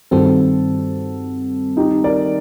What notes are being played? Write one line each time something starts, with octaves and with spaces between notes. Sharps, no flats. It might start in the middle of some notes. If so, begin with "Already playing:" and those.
G2 D#3 G3 C4 F#4 A4
D#4 G4
A#4 D5